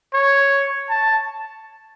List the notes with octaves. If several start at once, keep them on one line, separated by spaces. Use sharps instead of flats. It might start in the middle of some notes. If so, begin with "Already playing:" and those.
C#5
A5